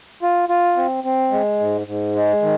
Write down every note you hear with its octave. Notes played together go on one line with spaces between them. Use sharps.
F4
F4
C4
C4
G#3
G#2
G#2
G#3
D#3